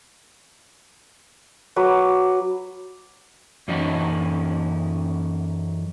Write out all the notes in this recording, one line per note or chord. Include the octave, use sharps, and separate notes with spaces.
F#3 B4 D6
F#2 E3 C#4 D#4 E4